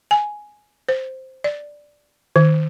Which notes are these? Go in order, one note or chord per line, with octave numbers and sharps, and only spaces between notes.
G#5
C5
D5
D#3